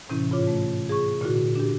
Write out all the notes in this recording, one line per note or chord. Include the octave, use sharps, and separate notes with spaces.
A2 C3 E3 C#4 E4
G#2 F4 C#5 D6
A3
G#4 C#6
A#2 D3 E4 F#4
D4 G4